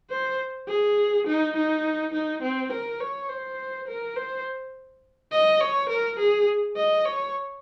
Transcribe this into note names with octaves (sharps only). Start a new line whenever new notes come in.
C5
G#4
D#4
D#4
D#4
C4
A#4
C#5
C5
A#4
C5
D#5
C#5
A#4
G#4
D#5
C#5